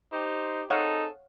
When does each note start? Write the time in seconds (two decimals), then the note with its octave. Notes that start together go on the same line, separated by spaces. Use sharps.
0.13 D#4 G4 C5
0.70 C4 D#4 G#4 A4 C#5 F5 F#5